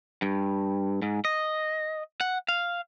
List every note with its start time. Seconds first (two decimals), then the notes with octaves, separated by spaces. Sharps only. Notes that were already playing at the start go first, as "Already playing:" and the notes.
0.22 G2
1.02 G#2
1.25 D#5
2.21 F#5
2.48 F5